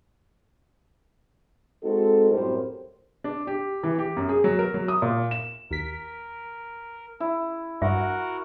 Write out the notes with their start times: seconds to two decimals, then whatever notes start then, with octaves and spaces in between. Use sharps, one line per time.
1.83 G#3 C4 D#4 F#4 A4
2.30 F#2 A2 G3 C4 A#4 C5
3.24 D4
3.47 G4
3.83 E3
3.98 G4
4.17 F#2
4.29 G#4
4.44 F#3
4.59 A#4
4.74 F#3
4.88 D#6
5.02 A#2
5.31 E7
5.71 D#2 A#4 B6
7.20 E4
7.82 G2 F#4 A#4 E5 F#5